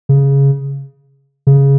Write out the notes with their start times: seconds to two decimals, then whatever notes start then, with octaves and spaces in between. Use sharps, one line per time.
0.09 C#3
1.47 C#3